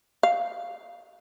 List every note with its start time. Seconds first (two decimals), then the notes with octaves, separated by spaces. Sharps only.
0.23 F5